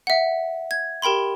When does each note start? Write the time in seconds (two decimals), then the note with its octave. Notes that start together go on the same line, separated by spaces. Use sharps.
0.07 E5 F#5
0.71 G#6
1.02 G4 A#4 G5 B5 C6